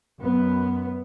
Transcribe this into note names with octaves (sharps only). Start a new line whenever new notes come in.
F#2 B3